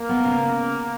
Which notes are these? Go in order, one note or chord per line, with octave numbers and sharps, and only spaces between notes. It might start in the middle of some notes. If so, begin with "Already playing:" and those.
Already playing: A#3
B3
C#3